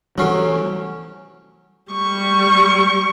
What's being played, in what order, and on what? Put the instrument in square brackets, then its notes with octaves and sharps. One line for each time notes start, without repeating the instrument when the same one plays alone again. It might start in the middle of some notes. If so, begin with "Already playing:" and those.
[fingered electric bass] E3 G3 [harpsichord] F#3 C#4 [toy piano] E4 G4 A4
[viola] G3 C#6